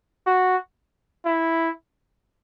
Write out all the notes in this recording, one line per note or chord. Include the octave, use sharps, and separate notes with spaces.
F#4
E4